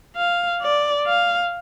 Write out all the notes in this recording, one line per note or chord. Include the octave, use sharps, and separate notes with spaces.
F5
D5
F5